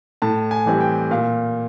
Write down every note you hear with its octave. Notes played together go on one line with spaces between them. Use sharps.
A2 A5
G#5
E3 G3 C4
G5
A#2 F5